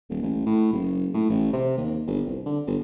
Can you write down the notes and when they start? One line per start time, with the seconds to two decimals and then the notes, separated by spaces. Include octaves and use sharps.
0.09 D#1
0.22 A1
0.46 A2
0.73 F#1
1.14 A2
1.30 A1
1.53 C3
1.78 D#2
2.07 G1
2.26 C2
2.46 D3
2.67 G1